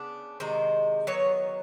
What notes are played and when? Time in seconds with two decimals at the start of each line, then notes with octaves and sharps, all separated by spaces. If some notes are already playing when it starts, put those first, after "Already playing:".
Already playing: C#3 B3 D4
0.40 C3 D#3 G#3 C5
1.07 D#3 F#3 B3 C#5